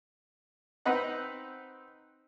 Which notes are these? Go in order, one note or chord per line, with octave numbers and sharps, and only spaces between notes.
C4 D#4 B4 D#5 F#5